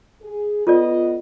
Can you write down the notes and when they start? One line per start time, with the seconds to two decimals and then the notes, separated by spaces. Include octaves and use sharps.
0.22 G#4
0.67 B3 F4 A4 D5 D#5